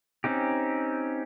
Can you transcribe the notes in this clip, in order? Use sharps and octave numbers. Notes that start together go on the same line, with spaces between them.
C4 C#4 D#4 G4